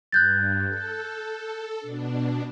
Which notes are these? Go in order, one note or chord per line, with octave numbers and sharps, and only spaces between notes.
G2 F#6 G6 A6
A4
B2 D4